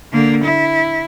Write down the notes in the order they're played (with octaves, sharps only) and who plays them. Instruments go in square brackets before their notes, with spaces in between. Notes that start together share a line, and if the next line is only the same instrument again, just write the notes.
[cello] D3 A#3
E4